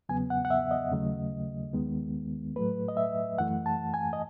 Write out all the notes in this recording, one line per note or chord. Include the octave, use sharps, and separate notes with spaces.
E2 C#3 F#3 B3 G#5
F#5
F#5
E5
D#5
D#2 C#3 F#3 A3
D#2 D#3 G#3 B3
A2 F#3 A3 B4
D#5
E5
F#2 E3 A3 F#5
A5
G#5
D#5